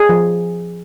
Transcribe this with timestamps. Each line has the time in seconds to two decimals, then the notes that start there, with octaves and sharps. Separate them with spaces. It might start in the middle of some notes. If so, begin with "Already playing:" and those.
Already playing: G#4
0.09 F3